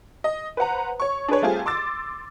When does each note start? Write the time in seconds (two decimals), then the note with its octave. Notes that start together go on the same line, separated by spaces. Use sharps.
0.24 D#5
0.57 B4 C5 F#5 A#5
1.00 C#5 C#6
1.28 D4 G#4 B4 C#5
1.42 G3 A3 C4 F4 G4 G#4
1.66 C6 D6 E6 A6